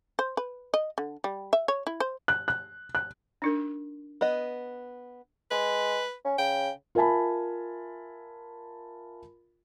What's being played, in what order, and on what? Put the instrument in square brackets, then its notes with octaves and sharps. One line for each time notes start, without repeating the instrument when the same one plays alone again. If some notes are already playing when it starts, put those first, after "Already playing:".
[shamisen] C5
B4
D#5
D3
G3
E5
C#5
E4
C5
[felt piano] F#6
F#6
F#6
[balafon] D4 D#4 A#4
[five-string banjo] B3 D#5
[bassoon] G#3 [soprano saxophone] B4
[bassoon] C#4
[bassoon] C#3 [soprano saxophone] G5
[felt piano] F4 A#4 E5 G#5 A5 B5